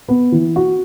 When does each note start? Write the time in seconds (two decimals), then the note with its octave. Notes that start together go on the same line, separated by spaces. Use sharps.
0.09 B3
0.32 E3
0.56 F#4